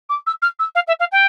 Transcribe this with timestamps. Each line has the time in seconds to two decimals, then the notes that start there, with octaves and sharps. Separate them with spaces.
0.09 D6
0.26 E6
0.42 F6
0.59 E6
0.75 F5
0.87 E5
0.99 F5
1.12 G5